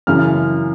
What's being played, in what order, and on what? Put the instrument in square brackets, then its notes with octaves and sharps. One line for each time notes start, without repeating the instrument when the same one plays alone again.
[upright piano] F#2 C#3 E3 F6